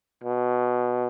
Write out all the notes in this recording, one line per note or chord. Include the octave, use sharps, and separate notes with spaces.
B2